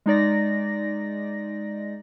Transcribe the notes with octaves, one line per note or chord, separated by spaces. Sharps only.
G#3 D#4 D5 A#6